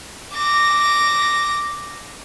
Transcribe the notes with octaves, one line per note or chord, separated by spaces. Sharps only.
D6 A#6